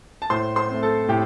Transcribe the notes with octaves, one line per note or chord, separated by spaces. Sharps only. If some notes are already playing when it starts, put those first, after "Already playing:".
A5
A2 C5 C6
C5 C6
A3 C4
A4 A5
A2 G4 G5